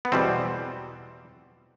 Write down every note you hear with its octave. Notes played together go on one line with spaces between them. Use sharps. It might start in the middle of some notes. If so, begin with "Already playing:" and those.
B3
E2 B2 G3 C4